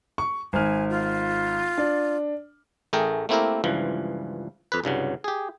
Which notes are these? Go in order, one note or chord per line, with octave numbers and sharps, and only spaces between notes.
C#6
G#1 G#5 F6
F4
D4
A1 A3 G#4 A#4 G5
A3 A#3 C4 E4 G4 A#4
C#2 G2 E3 F3
F2 B4
C2 G2 C#3 F#3
G4 G#4